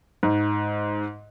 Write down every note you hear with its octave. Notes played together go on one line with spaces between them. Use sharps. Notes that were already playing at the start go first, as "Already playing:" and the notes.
G#2